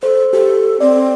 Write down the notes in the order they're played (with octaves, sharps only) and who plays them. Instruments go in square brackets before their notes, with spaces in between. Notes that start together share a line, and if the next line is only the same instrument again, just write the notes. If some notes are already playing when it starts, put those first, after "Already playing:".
[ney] A4 [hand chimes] C5
[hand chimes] G4 [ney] A4
[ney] C4 [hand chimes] D5